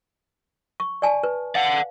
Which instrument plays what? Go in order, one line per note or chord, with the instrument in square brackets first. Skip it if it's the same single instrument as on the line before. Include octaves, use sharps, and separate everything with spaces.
[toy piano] C#6
D5 G#5 A5
B4
[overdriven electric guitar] D5 F#5 [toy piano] F5